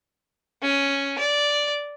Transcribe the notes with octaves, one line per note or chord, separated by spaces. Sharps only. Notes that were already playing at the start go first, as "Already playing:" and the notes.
C#4
D5